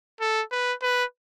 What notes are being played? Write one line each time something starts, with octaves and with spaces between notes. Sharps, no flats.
A4
B4
B4